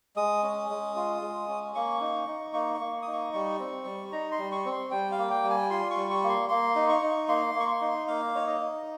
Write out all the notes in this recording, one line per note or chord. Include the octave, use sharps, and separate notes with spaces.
G#3 D#6
C#4
G#3
F4
G#3
C#4
A#3 C#6
D#4
D#4
A#3 C#6
C#6
A#3
D#4 D#6
C#6
G3 C#6
C4
G3
D#4 A#5
C6
G3
C#6
C4
C6
G3 G5
F5
A#3
G5
G3
G#5
F4 C6
C#6
G3
C#6
A#3
C6
A#3 C6
D#4
C#6
D#4
A#3 C6
A#3
C#6
C6
D#4
A#3 F5
D#4 C#5
D#5
D#4